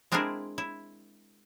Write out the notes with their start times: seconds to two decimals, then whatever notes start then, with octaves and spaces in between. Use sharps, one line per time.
0.12 G#3 C4 D4 E4 G#4 A#4
0.58 E4